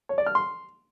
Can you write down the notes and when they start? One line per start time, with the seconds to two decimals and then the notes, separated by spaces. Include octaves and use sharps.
0.09 C#5
0.18 D5
0.26 F6
0.35 C6